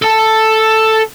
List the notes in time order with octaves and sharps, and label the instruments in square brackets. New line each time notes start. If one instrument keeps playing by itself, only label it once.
[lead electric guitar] A4 A5